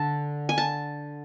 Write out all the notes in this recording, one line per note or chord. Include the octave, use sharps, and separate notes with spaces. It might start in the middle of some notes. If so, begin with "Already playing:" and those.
Already playing: D3 A5
G#5
A5